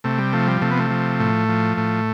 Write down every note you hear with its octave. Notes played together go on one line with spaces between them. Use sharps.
C3 A3
G3
F3 A3
G3
C3 A3
B3
A3
F3
A2
F3
A2